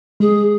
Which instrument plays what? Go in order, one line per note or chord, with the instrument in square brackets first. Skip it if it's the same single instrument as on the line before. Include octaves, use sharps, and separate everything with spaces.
[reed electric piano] G#3 [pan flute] G#4